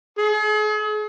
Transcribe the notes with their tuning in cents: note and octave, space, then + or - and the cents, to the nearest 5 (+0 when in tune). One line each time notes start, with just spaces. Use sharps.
G#4 +40